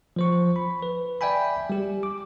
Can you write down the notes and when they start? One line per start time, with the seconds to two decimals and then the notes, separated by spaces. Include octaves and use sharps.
0.16 F3 C5 C#6
0.56 B5
0.82 B4
1.21 D5 E5 G5 G#5 B5
1.70 G3 G4
2.03 D6